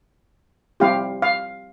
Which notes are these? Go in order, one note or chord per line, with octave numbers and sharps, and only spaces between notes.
G3 C4 E4 G4 F5
F5